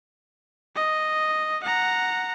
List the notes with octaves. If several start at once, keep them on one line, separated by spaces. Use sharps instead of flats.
D#5
F#5 A#5